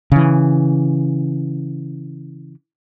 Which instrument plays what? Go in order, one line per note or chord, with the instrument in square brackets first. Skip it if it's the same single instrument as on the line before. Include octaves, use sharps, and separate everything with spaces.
[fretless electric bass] C#3 E3